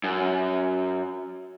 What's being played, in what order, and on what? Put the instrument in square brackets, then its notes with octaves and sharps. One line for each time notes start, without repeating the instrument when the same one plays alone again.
[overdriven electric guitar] F#2